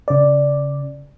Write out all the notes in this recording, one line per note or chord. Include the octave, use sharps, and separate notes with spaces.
C#3 D5